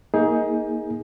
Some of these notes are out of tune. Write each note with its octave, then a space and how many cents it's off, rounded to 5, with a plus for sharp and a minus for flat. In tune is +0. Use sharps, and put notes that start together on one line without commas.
A#3 +0 D#4 +25 G#4 +0